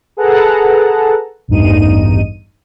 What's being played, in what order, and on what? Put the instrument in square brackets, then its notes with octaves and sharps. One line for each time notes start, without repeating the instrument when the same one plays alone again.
[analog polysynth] G#4 A4 B4 F#5 A5 A#5
A1 E2 G2 D#4 D#7